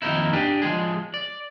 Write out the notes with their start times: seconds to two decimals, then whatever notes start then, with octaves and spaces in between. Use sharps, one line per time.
0.02 F2 D#3 A#3 D#4 E4
0.33 D4 G4 G#4
0.62 F3 G#3 G#4
1.14 D5